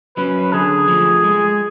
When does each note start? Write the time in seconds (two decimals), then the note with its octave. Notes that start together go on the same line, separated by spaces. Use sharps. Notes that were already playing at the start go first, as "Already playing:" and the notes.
0.17 F#3 C#4 B4
0.53 D3 G#4
0.88 F3 A3
1.24 G#3